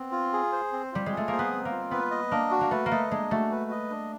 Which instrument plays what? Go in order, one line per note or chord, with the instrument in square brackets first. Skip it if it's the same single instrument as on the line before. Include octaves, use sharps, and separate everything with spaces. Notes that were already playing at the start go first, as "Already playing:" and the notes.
Already playing: [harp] B3 [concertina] C4
[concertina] F4
G#4
C5
C4
[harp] G3 [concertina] F4
[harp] G#3
[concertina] G#4
[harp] A3
[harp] A#3 [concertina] C5
[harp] B3
[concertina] C4
[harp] A#3
[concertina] F4
[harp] B3 [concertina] B4
[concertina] D#5
[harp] A#3 [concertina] D4
[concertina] F#4
[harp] A#3
[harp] A3 [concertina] B4
[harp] A#3
[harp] A3 [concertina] D#5
[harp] G#3 [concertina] D4
[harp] A3 [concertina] F#4
[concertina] B4
D#5
D4